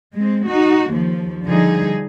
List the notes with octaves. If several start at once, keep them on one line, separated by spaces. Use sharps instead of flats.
G#3 C4
D#4 F#4
D#2 F3
D3 F3 G3 D#4 G#4